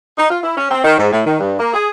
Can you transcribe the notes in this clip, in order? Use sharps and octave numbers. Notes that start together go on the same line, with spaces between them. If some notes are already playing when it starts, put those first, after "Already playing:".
D#4
F4
E4
C#4
C4
D#3
G#2
A2
D#3
G2
A#3
G#4